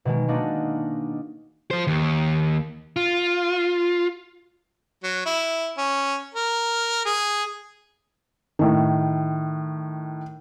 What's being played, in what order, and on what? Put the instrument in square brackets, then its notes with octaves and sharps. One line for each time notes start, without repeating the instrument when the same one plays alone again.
[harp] B2 D#3 G#3
G#3 A#3 D4 D#4 F#4
[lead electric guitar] F3 C5
D#2
F4
[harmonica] F#3
E4
C#4
A#4
G#4
[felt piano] A2 D#3